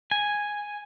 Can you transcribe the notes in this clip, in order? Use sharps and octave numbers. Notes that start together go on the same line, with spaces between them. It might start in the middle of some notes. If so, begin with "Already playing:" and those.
G#5